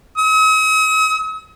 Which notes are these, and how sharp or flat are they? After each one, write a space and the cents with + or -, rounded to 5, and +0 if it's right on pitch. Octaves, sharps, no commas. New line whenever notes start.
D#6 +45